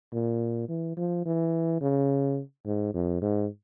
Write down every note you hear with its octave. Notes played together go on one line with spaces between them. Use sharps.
A#2
E3
F3
E3
C#3
G#2
F2
G#2